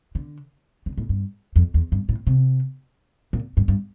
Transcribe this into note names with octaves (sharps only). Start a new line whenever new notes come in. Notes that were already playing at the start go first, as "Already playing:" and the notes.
D3
D3
A2
G2
F2
E2
G2
A2
C3
A#2
G2
G2